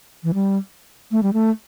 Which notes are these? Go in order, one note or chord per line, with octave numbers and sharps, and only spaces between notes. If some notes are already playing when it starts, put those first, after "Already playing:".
E3
G3
A3
G3
A3